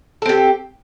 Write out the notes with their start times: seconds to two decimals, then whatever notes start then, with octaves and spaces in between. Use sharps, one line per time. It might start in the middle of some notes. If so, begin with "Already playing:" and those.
0.22 A4
0.26 C4
0.29 G4